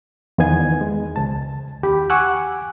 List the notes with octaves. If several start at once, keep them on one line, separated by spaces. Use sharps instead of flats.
E2 D#3 B3 G#5 G#6
G#3
C#2 A5
D#2 G4 B5
F#5 G#5 C#6 D6 E6 F#6